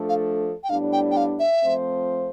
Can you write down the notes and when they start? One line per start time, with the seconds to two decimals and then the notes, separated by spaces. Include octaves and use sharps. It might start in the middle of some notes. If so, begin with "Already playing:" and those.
Already playing: F3 A3 D4 A4
0.09 F5
0.64 G5
0.70 A2 G3 B3 D4 F5
0.93 G5
1.11 G5
1.17 F5
1.39 E5
1.62 F3 A3 C4 F4 C5